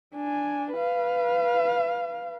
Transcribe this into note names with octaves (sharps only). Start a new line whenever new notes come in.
D4 G#5
B4 F5